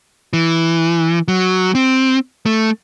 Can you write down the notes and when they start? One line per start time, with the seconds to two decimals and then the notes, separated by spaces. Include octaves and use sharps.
0.33 E3
1.28 F#3
1.75 C4
2.46 A3